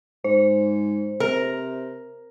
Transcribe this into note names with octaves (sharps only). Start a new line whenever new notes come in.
G#2 C5
C3 A#4